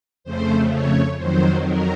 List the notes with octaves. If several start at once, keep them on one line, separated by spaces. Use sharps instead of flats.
F2 C#3 A3 C5
C#5
F2 D#3 F#3 C5
A#4